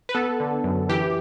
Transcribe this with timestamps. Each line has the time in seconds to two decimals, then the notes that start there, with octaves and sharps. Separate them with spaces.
0.09 B4
0.14 B3 A4
0.40 D3
0.64 F#2
0.89 E3 G4